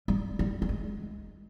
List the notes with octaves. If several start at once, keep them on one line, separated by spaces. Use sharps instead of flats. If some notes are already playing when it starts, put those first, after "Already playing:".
G3
G3
G3
G#3